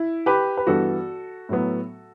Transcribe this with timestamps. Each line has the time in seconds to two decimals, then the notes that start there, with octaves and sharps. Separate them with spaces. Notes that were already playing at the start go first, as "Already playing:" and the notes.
Already playing: E4
0.26 G4 B4
0.57 B4
0.67 G2 E3 B3 F#4 A4
1.49 A2 F#3 B3